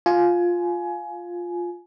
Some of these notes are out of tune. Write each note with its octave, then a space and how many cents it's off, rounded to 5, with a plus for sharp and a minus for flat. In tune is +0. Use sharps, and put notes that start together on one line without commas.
F4 +5 G#5 +20